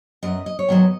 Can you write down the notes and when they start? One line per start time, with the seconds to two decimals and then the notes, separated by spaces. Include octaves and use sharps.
0.23 F#2 F#3 B3 D#5
0.46 D#5
0.59 C#5
0.68 G#2 D#3 F#3 B3 D#5